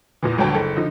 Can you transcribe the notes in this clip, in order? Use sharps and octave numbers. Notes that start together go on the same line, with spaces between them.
E2 A#2 E3
G1 D2 F#3 G5 A5
F#1 A4
D3 F3 D#4